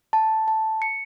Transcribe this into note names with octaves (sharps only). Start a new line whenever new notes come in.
A5
A5
C#7